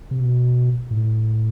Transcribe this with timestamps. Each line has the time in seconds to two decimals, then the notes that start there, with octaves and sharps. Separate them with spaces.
0.11 C3
0.20 B2
0.91 A2